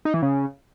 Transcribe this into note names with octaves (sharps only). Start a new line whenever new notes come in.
D#4
E3
C#3